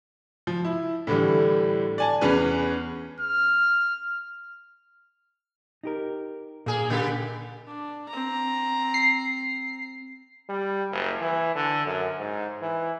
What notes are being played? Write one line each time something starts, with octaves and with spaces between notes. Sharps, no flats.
F3
E4
A2 D3 E3 G3
D5 G#5 A5
E2 C#4 G#4 B4
F6
D#4 G4 A#4
A#2 A#3 G#4
C#3 A#3 G4
D4
C4 A#5
C7
G3
F#1
E3
D3
F#2
G#2
E3